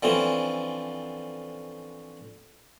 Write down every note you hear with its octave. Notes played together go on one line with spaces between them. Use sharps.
D3 E3 F3 C4 C#4